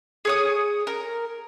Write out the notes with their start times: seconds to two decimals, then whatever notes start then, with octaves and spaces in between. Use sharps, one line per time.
0.25 G#4 C#5 D#6
0.87 A#4